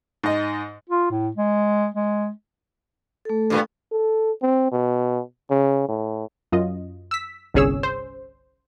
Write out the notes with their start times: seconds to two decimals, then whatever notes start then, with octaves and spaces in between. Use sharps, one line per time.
0.23 G#2 D#5
0.89 F4
1.11 A2
1.36 G#3
1.95 G#3
3.25 A3 A4
3.50 G2 A#2 B3
3.92 A4
4.42 C4
4.72 B2
5.50 C#3
5.88 A2
6.52 F#2 F4 D#5
7.11 E6 B6
7.54 G1 C2 C#4 G#4 C#5 E6
7.83 C5